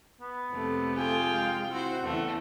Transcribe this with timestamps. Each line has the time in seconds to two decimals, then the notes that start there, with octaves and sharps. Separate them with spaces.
0.21 B3
0.53 F2 C3 A3 A4
0.96 F4 G#4 G5
1.28 G#3 F5
1.71 C4 E4 F#4 C5 F#5
2.04 E2 C#3 A3